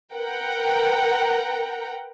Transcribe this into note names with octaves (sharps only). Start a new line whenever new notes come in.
A#4 B4 F#5 G5 A#5